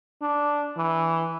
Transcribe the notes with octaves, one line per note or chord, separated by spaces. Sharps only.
D4
E3